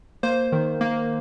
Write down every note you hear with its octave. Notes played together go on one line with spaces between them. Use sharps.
A#3 C5
D#3
A#3